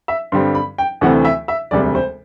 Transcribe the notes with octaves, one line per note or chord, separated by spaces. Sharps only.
E5
G2 D3 G3 C4 C6
B5
G5
D2 C3 E3 A3 C4 F#5
E5
E5
E1 D2 C3 G3 D5
C5